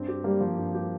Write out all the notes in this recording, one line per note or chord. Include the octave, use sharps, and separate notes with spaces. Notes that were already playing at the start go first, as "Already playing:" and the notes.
Already playing: G2 C4
G4
G3 A#3
F3
G2
G4